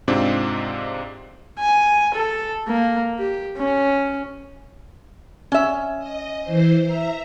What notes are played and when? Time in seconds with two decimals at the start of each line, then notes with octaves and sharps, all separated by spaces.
0.08 G#2 C3 C4 D4 D#4 F4
1.59 G#5
2.14 A4
2.68 A#3
3.19 G4
3.57 C#4
5.52 C#4 E5
5.99 D#5
6.43 E3 C5
6.82 E5 A#5